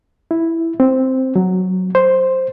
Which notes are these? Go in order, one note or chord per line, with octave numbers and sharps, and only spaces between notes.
E4
C4
F#3
C5